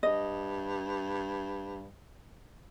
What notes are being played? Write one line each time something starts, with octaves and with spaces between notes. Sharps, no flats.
G2 D#5